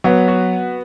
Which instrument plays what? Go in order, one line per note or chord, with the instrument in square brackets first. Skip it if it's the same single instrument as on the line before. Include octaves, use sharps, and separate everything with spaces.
[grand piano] F#3 [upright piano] B3
[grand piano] F#4